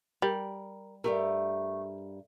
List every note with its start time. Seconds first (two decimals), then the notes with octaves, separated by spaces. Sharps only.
0.22 G3 A#4
1.04 G2 A3 G4 A#4